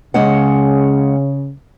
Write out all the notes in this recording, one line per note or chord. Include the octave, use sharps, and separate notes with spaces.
C#3 G#3 C#4 F#5